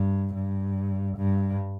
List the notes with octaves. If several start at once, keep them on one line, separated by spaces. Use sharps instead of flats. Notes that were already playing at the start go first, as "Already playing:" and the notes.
Already playing: G2
G2
G2